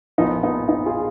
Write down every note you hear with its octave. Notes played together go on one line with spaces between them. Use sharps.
A#1 A#2 F3 B3 D#4
B3 D#4
B3 D#4
F4 G#4